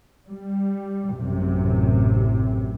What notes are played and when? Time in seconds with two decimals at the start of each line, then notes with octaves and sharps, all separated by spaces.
0.28 G3
1.14 A1 F#2 C3